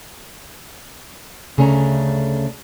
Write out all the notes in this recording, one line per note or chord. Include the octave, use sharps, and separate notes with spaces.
D2 C#3 A3 C#4 D4 A#5